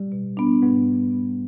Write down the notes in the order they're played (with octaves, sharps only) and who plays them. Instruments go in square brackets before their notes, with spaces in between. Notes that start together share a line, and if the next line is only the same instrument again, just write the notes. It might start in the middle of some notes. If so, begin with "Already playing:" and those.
Already playing: [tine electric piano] G3
[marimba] B2
B3 D4
[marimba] G#2 [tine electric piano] B3